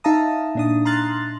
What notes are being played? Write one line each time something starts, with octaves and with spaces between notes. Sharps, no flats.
D#4 E5 F5 A5 A#5 D#6
A#2 D4 D#6
A#5 C6 F6 F#6 A6